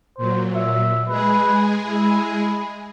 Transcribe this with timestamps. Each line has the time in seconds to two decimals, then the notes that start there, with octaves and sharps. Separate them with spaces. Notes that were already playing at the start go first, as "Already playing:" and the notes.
0.18 A#2 F#3 C5
0.56 E5
1.08 G#3 G#4 B4
1.87 E4